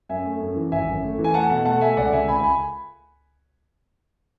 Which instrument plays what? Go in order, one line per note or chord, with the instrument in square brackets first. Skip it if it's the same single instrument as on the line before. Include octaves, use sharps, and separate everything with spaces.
[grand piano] F#2 E5 G#5
A3
F#2
E3
G#1 E5 G#5
F#2
A3
E3
G#5
A3 F#5 A5
B2 F#5 A5
A3 F#5 A5
A3 E5 G#5
C#2 D5 F#5
C#2 E5 G#5
C#2 G#5 B5
G#5 B5